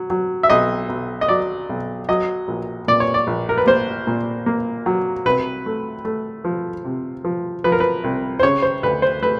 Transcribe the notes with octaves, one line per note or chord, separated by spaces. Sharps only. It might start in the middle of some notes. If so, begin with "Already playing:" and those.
Already playing: F#3
F#3
E5
B1 D#5
B1
D#5
F#3 D5
B1
F#3 D#5
A#1
A#2 D5
C#5
D5
A#1
A#4
B4
A#3 C5
A#2
A#3
F#3
C2 B4
A3
A3
F3
C3
F3
F3 B4
A#4
B4
C2
C5
C#3 C#5
C5
D2 B4
C5
A3 B4